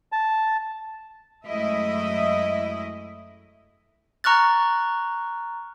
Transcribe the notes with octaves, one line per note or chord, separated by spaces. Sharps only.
A5
F#2 G#3 A3 E4 D#5 E5
A#5 C#6 F6 F#6 A6